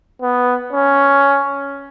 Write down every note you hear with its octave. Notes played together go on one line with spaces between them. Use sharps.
B3
C#4